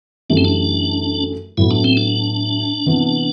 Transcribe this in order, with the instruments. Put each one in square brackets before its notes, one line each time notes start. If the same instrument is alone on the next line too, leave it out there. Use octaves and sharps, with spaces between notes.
[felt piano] F#2 E3 A3 E4 G4 [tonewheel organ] D4
[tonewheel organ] C4
D4
[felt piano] A2 F#3 B3 [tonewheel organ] E4
[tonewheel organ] D4
C4
D4
[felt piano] C3 E3 B3